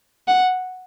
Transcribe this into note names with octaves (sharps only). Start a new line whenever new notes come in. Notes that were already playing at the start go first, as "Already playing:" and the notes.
F#5